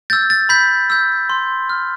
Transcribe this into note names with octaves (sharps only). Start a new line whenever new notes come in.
E6 G6 A6
A6
B5 G6 B6
E6 G6
C6
F6